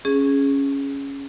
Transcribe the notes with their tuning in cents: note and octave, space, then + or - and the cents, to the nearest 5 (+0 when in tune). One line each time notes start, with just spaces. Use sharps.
C#4 +0 G#4 +0